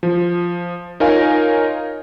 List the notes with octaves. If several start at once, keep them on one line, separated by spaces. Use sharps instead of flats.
F3
D#4 F4 A#4 C#5 F5 G#5